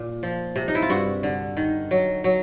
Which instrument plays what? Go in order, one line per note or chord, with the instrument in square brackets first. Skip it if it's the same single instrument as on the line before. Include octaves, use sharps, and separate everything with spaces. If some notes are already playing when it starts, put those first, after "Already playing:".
Already playing: [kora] A#2
F3
C3
D#4
E4
F4
G2 F#4
D3
D#3
F#3
F#3